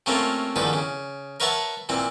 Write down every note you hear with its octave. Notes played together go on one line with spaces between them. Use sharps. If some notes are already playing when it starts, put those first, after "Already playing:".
C3 A3 A#3 C4 C#4 F4
E2 D3 D#3 F3 B4
C#3
A#4 B4 C#5 E5 F#5 A5
A#2 E3 C4